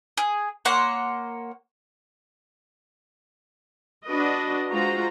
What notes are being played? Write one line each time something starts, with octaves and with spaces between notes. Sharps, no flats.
G#4
A#3 C#5 F#5 C6
D4 F#4 B4 D#5
G#3 F4 F#4 C5 A#5